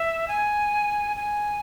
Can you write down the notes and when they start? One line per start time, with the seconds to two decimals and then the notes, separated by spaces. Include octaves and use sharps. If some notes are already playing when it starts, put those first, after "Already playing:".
Already playing: E5
0.28 G#5
1.17 G#5